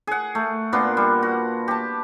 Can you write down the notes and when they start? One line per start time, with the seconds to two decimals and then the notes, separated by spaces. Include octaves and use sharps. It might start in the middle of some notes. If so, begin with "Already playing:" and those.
0.07 G#4 F#5
0.35 A3
0.73 A#2 B3 D4 C6
0.97 G3
1.23 F#4
1.68 G4 A5